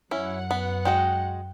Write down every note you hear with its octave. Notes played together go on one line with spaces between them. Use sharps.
F#2 C#4 E4 F#5
B3
G#3 F#4 D#5 G5